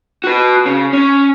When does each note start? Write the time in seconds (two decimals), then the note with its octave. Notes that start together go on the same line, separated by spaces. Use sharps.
0.24 F#4 B4
0.66 C#3
0.93 C#4